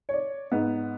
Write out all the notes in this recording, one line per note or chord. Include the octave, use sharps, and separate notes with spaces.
C#5 D5
G#2 B3